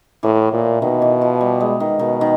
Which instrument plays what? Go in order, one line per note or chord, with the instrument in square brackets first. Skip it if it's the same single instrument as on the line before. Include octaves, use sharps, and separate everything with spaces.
[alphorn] A2 [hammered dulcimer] E3
[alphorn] A#2
[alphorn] B2 [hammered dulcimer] D#3
[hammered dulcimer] E3
F3
G3
G#3
D#3
[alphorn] B2 [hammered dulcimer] D#3
[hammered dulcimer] D#3